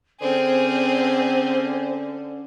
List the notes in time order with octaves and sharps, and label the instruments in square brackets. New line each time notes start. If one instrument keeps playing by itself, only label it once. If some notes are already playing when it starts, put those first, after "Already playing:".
[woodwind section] D3 C#4 [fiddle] C4 G#4 [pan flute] C5